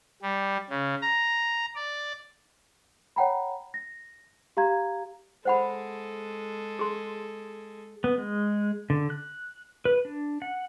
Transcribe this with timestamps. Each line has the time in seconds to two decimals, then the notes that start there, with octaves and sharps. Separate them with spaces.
0.22 G3
0.70 C#3
1.02 A#5
1.76 D5
3.16 C#5 F#5 G5 A#5 B5
3.74 A#6
4.57 G4 F5 A#5 G#6
5.45 G#3 A4 C5 F#5 B5
6.79 G#4 C6
8.04 B3
8.18 G#3
8.90 D3
9.10 F#6
9.85 B4
10.05 D4
10.42 F#5